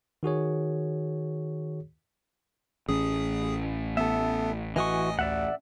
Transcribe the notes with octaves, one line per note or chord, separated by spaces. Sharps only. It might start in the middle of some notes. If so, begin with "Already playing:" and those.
D#3 F#4 G#4 C#5
A1 C#4 G#4 D#6
B3 A4 E5
E3 F#4 D#5 G#5 C#6 D#6
D2 D5 E5 F#5